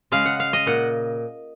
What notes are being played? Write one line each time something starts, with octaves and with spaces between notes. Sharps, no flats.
C#3 G#3 F5
F#5
F5
D#5
A#2 F#5